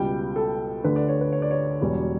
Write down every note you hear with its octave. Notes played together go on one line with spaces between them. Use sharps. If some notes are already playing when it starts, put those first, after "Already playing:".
Already playing: C#2 B2 G3 G5
A4
D2 D3 A3 D4 B4
D5
C#5
B4
C#5
D5
C#5
E1 E2 B2 G3